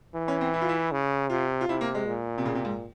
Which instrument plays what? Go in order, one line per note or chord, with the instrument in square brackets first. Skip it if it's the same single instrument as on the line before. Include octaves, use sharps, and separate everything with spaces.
[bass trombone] E3
[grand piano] C#4
C4
E4
F4
E4
[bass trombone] C#3
[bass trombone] C3 [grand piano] F4
[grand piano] F4
[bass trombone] C3 [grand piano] E4
[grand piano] A#3
G#3
[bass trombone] A#2
[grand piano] C3
C#3
C3
G#2